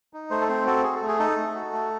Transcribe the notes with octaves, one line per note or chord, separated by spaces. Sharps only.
D#4
A3 C5
A4
C4 C5
F#4 A4
G#4
A4
A3
G#4
D#4 A4
A3
F#4
A3